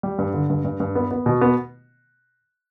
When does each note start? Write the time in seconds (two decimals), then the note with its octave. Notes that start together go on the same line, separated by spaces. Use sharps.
0.03 G3
0.18 G2
0.34 D3
0.50 G2
0.64 G2
0.80 G2
0.95 B3
1.11 B3
1.26 B2
1.41 B3